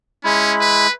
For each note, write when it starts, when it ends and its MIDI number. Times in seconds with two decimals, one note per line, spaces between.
0.24 0.87 56
0.24 0.55 61
0.24 0.87 64
0.24 0.87 83
0.61 0.92 71